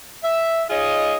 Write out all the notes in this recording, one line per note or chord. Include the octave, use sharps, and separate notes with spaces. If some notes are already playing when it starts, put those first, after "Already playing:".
E5
D#4 F4 G#4 C#5 D#5